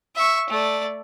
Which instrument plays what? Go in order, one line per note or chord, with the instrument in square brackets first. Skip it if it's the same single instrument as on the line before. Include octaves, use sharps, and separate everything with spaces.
[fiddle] E5 C#6
A3 D5